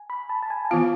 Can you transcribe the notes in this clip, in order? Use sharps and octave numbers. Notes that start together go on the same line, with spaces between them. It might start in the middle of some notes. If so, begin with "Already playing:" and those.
Already playing: G#5
B5
A5
A5
G#5
G#5
E3 B3 F4 F5